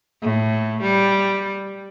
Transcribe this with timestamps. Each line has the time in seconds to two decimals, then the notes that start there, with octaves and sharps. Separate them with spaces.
0.22 A2
0.82 G3